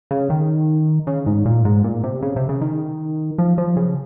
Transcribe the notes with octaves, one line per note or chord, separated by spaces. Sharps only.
C#3
D#3
C#3
G#2
A#2
G#2
A#2
C3
C#3
C3
C#3
D#3
F3
F3
C#3